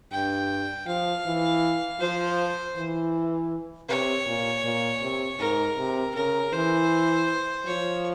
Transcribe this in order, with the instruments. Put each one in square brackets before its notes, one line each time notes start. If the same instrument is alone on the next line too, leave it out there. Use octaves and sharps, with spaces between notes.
[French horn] G2 [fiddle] G5
[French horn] F3 [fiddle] F5
[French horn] E3
[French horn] F3 [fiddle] C5
[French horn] E3
[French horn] C3 [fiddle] C#5
[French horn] A#2
A#2
C3
[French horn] G#2 [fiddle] A#4
[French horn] C3
[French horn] C#3 [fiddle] A#4
[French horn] E3 [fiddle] C5
[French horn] F3 [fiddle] C#5